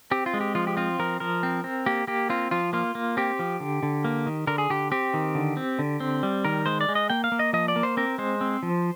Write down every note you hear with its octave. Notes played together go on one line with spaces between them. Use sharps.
C4 G4
F4
G#3
G4
F3 F4
G4
C4 F4
F3 A#4
F3 A#4
C4
C4
A#3 G4
A#3 G4
C4 F4
F3 F4
A#3 F4
A#3
C4 G4
F3
D3
D3
A#3
D#3
D3 A#4
G#4
D3 G4
C4 G4
D#3
D3
C4
D3
C4
G3
D#3 A#4
G#3 C5
D5
G#3
D#5
A#3 G5
F5
A#3
D#5
F3 D#5
D5
A#3
C5
C4 A#4
G#3 C5
C4
F3